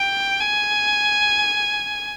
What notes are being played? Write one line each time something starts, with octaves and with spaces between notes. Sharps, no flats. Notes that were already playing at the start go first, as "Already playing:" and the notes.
Already playing: G5
G#5